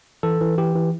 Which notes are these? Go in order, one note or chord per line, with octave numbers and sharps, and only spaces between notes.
E3 A4
E3
E3 G4
E3